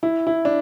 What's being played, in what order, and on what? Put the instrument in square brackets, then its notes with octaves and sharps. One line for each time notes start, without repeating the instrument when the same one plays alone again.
[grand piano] E4
E4
D4